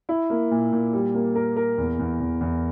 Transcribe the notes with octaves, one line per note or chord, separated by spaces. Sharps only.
E4
A#3
A#2
A#2
G3
A#3
A#4
A#4
E2
E2
E2
E2